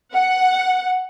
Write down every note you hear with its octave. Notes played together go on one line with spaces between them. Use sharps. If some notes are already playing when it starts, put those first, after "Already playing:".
F#5